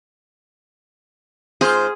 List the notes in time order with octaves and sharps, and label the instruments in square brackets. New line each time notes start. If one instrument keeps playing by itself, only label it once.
[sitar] G#2 F4 C5 [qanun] G#4